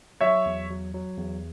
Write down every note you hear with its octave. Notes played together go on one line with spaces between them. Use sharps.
F#3 C#5 E5
E2
F#3
F#3
E2